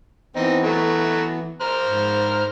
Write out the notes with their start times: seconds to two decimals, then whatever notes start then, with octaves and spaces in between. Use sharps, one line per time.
0.36 E3 B3 C4 D#4
0.63 F#3 A3
1.61 C5 A#5 F6
1.85 G#2